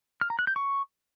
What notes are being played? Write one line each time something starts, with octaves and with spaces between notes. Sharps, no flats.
F6
A#5
F#6
G6
C#6